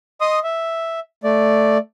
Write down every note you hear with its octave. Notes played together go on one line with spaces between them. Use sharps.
D#5 C6 D#6
E5
A3 D5